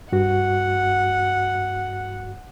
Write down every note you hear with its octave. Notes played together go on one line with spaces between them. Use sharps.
G2 F#4 F#5